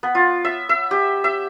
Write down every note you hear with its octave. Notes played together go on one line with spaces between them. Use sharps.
B3
F4
E5
E5
G4
E5